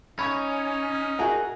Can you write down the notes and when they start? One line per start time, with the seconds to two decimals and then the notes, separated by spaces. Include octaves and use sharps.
0.19 C#4 D#4 B5 C#6 G#6
1.19 F#4 G#4 A#4 E5 F#5